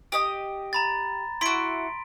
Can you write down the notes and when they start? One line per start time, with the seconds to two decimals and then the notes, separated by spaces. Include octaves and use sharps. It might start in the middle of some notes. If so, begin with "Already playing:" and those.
0.12 G4 D#5 D#6
0.73 A#5 B5 A6
1.41 E4 F#4 C6 B6 D7